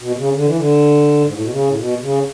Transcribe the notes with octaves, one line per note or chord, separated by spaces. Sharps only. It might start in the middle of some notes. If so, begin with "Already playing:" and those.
B2
C#3
D3
E3
D3
G#2
A2
B2
C#3
A2
B2
C#3